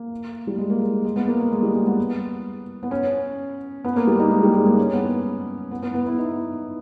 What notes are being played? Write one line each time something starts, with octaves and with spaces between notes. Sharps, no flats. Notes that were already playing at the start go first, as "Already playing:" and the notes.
Already playing: A#3
G3
G#3
A#3
G#3
G#3
B3
A#3
A#3
G#3
G3
G#3
B3
B3
C#4
B3
A#3
G3
D#4
G#3
G3
G#3
A#3
C#4
B3
B3
B3
B3
E4
D#4